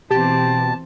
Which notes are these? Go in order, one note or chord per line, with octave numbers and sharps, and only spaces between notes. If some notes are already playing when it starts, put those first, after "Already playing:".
B2 E3 C4 G4 A5